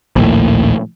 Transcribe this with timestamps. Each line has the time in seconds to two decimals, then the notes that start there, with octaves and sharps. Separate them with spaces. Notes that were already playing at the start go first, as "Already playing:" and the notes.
0.16 A#1 D#2 A2